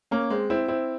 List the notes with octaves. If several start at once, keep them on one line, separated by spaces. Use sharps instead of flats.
A#3 C#4
G#3 C4
C4 E4
C4 E4